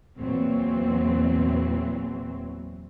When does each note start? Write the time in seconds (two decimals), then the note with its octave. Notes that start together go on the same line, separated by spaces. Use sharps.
0.18 E2 A#2 E3 F#3 C4